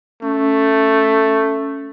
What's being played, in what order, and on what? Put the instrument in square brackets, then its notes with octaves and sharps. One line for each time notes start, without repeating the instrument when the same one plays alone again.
[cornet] A3 [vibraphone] C#4